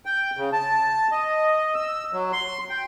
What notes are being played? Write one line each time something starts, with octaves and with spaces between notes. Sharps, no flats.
G5
C#3
A5
D#5
E6
F#3
C6
G5